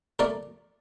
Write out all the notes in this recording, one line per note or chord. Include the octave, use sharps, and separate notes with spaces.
A3 A#4 D5